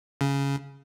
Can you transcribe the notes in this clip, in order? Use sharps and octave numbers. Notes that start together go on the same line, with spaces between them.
C#3